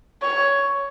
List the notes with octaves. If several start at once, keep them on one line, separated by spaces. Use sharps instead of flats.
C#5